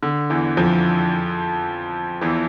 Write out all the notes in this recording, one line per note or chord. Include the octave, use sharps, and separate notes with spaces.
D3
E2 E3
F2 F3
E2 E3